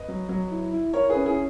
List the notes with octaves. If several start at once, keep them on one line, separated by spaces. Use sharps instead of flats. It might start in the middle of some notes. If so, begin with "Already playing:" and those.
Already playing: B4 D#5
F#3
F#3
E4
E4
E4 A#4 C#5
G#4 B4
C#4
E4 G#4